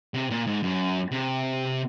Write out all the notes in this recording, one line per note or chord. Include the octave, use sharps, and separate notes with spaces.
C3
A#2
G#2
F#2
C3